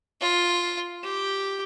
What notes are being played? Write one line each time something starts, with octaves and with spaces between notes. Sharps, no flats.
F4
G4